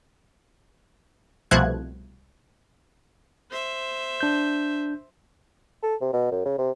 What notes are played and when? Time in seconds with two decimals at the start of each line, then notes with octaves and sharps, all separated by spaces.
1.51 C2 B2 F3 A3 F#6 G#6
3.51 C5 E5
4.20 D4 G6
5.83 A4
6.01 C3
6.13 B2
6.31 F#2
6.45 C#3
6.58 C3